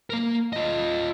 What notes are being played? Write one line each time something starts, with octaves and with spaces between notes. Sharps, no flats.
A#3 A#4
F4 D#5